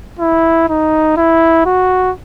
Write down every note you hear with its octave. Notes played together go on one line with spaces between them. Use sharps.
E4
D#4
E4
F#4